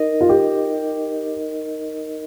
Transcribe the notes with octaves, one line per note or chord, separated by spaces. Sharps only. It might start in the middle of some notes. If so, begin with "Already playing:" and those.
Already playing: D#4 A#4 D#5
F4
G4